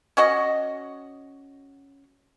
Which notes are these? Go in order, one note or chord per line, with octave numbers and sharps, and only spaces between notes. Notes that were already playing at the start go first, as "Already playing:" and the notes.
C#4 F#4 D#5